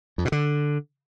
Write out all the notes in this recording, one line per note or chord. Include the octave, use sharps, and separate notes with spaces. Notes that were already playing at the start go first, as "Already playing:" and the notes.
F2
B2
D3